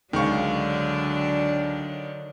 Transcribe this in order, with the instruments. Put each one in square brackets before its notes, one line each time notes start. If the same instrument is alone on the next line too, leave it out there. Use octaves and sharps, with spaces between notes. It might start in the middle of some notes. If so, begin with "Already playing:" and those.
[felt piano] C#2 F5 [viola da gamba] D3 F#3 D4 [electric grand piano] D#3 C#6